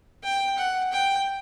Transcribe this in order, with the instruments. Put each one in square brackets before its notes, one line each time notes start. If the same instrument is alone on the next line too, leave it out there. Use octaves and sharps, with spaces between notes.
[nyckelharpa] G5
F#5
G5